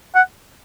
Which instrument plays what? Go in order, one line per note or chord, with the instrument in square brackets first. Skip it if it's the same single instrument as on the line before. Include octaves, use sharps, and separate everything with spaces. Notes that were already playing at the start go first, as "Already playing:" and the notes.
[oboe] F#5